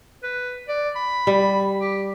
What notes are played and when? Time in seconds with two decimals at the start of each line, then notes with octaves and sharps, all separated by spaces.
0.23 B4
0.68 D5
0.96 B5
1.27 G3
1.81 G4